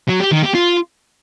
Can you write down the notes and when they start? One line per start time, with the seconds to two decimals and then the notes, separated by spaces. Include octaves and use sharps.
0.08 F#3
0.20 G4
0.32 D#3
0.43 G4
0.55 F4